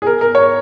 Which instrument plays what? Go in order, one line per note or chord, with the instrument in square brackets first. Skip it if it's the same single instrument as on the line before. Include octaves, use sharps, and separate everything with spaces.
[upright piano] G#4
A#4
A#4
C#5